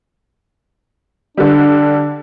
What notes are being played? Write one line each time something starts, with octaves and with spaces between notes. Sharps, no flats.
D3 G3 D4